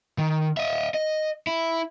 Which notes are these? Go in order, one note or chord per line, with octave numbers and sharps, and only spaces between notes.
D#3
D#5 E5
D#5
E4